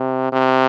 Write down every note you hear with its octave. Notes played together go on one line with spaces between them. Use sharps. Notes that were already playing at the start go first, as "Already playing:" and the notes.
Already playing: C3
C3